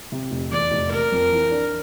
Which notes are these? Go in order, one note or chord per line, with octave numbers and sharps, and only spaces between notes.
C3
F1
E2 D5
F1
A#3 A#4
F2
E3
D4